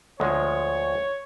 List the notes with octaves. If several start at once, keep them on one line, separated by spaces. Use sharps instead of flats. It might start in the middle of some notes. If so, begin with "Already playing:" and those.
D2 F3 G#3 C#5